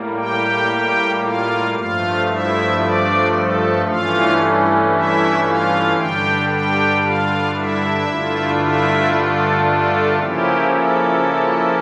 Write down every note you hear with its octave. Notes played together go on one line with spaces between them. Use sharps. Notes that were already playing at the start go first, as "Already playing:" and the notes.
Already playing: A2 G3 A#3
G4 G5
F4 F5
G2 F3 A3 F4 F5
E4 E5
D4 D5
A4
G2 E3 A3 C#4 F4 F5
E4 E5
F4 F5
G2 D3 G3 D4 G4 G5
G4 G5
F4 F5
E4 E5
G2 D3 A3 D4 F4
E4 E5
A4
A4
C#3 F3 A#3 C#4 E4 G4
A4